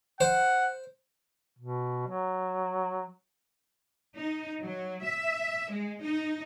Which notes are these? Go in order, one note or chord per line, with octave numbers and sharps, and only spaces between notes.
C5 F#5
B2
F#3
D#4
F#3
E5
G#3
D#4